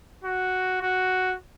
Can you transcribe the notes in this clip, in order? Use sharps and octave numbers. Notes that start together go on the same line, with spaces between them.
F#4
F#4